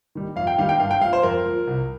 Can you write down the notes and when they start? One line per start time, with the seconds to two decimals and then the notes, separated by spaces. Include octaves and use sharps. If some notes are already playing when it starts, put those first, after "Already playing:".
0.15 D#3 G3
0.36 F2 F5
0.47 G5
0.58 D#3 G3 F5
0.69 G5
0.80 G2 F5
0.91 G5
1.01 F3 F5
1.13 C5
1.23 F2 A#4
1.46 F3
1.67 C2